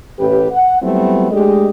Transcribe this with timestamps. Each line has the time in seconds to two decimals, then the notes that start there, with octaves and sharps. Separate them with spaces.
0.19 A1 G4 B4
0.51 F#5
0.82 F#3 G3 A3 B3 C4 E4
1.31 G#3 A3 D4 G4 D#5